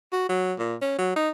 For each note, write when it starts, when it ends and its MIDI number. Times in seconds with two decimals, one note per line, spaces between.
0.12 0.28 66
0.29 0.53 54
0.59 0.75 46
0.81 0.96 61
0.98 1.15 54
1.16 1.30 63